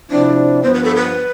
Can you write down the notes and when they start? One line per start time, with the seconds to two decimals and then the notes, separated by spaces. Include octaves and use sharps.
0.10 C3 F3 C4 D4 E4
0.63 G2 F3 B3 C5
0.74 B4
0.84 A4
0.95 B4